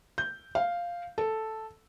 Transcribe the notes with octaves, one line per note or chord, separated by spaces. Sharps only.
G6
F5
A4